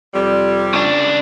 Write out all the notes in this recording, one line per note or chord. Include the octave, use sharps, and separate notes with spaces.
F2 C3 G3
C#3 D4